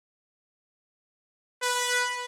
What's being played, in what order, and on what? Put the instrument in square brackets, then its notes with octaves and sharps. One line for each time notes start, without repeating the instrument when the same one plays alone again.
[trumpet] B4